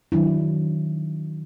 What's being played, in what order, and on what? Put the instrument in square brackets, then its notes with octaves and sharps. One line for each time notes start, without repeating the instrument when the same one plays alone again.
[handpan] D#3 F#3 D4 E4